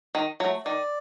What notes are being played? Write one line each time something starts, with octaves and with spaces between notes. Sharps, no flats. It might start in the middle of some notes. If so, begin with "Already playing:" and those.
D#3
F#3 A3
D#3 D5